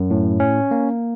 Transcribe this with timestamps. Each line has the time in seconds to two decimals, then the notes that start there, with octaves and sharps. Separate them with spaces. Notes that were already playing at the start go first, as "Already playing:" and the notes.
Already playing: F#2
0.10 A2
0.40 C#4
0.71 A#3